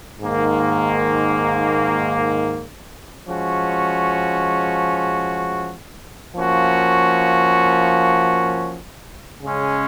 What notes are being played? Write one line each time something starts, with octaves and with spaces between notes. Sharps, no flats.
G#2 D#3 A#3
F3 G#3 C#4 F#4
F3 A#3 C#4 F#4
C#3 G#3 C#4